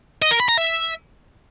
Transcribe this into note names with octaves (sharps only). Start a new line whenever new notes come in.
D#5
A#4
B5
A#5
E5